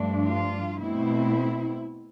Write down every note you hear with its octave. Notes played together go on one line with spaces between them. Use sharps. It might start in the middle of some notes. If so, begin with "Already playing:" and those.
Already playing: G2 F3 A3 D4
F4
B2 A3 C4 E4